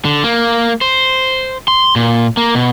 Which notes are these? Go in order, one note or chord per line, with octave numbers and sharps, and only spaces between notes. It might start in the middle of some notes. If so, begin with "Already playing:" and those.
D3
A#3
C5
C6
A#2
A#3
B2